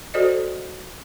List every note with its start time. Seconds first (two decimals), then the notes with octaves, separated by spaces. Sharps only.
0.14 F#4 A4 C5 D5 D#5